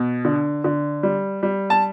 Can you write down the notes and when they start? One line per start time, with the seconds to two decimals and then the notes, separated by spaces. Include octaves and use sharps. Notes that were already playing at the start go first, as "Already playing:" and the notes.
Already playing: B2
0.25 D3
0.64 D3
1.03 G3
1.43 G3
1.70 A5